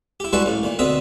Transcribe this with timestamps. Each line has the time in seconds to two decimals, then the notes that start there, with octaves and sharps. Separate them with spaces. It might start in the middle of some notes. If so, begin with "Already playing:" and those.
0.20 E4 G4
0.33 G3 G#3 E4 F#4 B4 A5
0.46 A1 A2
0.63 A#2 D#3
0.79 B2 D3 C4 E5 D#6